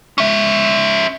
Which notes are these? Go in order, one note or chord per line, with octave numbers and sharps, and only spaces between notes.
C#4 E5